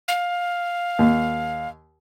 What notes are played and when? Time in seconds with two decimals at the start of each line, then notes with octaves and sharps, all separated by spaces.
0.08 F5
0.99 D#2